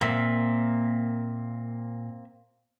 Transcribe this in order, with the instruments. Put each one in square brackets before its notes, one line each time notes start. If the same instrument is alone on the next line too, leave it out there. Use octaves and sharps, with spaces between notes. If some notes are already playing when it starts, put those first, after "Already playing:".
[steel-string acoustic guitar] A#2 [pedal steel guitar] A#3 C4 E5